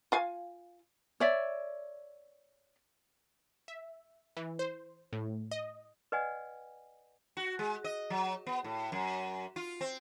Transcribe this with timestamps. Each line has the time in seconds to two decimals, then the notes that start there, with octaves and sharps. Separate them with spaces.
0.12 F4 F5 G#5
1.20 C#5 D5 E5
3.68 E5
4.37 E3
4.59 C5
5.13 A2
5.51 D#5
6.12 B4 D5 D#5 F#5 G#5
7.37 F#4
7.59 G#3
7.84 D#5
8.10 F#3
8.47 B3
8.64 A2
8.92 F#2
9.56 F4
9.81 C4